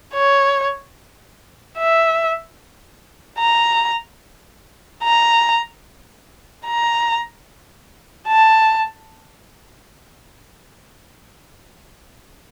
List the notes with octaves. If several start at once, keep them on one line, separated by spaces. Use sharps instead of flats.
C#5
E5
A#5
A#5
A#5
A5